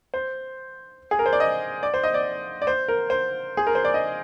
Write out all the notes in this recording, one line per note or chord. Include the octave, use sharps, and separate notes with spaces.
C5
G#4
A#4
C5
D5
D#5
D5
C5
D#5
D5
D5
C5
A#4
C5
G#4
A#4
C5
D5
D#5